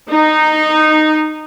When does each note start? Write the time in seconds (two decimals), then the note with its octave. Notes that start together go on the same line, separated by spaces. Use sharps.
0.11 D#4